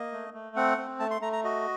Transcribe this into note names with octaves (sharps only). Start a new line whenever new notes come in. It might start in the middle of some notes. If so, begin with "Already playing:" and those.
Already playing: A#3 D#5
A3
A3
C4 F#5
C4
A3 A5
C6
A3 A#5
A#5
F#4 D#5